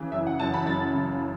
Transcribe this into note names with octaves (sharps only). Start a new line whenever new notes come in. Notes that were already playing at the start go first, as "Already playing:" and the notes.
Already playing: C#3 E3
F#2 E5
F#5
F#2 A5
B5
F#2 A6
C#3